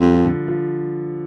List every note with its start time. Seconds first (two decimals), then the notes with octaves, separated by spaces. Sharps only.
0.01 F2 G3
0.13 F3
0.25 D3
0.48 F3